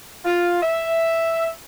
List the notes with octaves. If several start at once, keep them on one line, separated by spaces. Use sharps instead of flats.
F4
E5